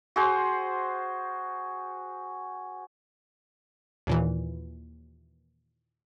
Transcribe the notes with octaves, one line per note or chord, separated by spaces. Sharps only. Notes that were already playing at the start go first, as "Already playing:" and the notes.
F#4 G#4 C5
D#2 A#2 E3